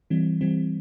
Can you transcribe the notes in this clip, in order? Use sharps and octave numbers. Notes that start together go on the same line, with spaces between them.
E3 G3 C4
E3 G3 C4